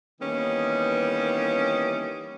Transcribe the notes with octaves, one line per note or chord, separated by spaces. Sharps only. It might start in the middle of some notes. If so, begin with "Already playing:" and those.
D#3 E3 G3 A#3 B3 C#4